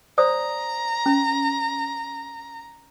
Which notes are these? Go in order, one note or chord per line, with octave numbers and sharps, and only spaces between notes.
C5 D5 A#5 D#6
C#4